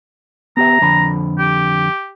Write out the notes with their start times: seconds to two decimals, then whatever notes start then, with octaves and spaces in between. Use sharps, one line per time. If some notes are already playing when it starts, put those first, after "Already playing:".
0.57 B3 G4 E5 A#5
0.81 F2 D3 B5
1.39 G4